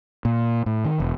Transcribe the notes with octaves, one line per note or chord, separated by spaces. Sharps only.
A#2
A2
D#3
E1